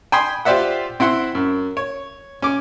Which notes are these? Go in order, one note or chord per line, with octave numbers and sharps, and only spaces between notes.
G5 G#5 B5 C6 D#6
F4 G4 C5 D5 E5 F#5
C4 E4 F#5 C6
F#2
C#5
C#4 D6